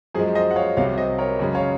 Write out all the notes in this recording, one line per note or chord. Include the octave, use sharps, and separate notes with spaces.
F#2 F3 G#3 G#4 C5
C5 D#5
F#5
C#5 F5
C2 C3 F#3 C#5 F5
C5 D#5
A#4 C#5
F#2 C#3 G#3
C#5 F5